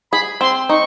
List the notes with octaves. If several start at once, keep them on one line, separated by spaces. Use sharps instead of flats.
G#4 B5
C4 C6
D#4 C#6